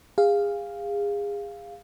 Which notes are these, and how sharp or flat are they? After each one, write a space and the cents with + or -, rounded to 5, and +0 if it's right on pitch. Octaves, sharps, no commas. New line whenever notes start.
G#4 -30 F5 +0